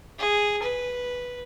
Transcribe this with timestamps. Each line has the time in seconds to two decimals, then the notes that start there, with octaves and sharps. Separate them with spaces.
0.19 G#4
0.62 B4